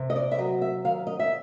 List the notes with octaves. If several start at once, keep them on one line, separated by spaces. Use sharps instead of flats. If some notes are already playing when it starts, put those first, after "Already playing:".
Already playing: C3
D#5
D5
E5
F#3 D#5
E5
D#3 F5
D#5
E5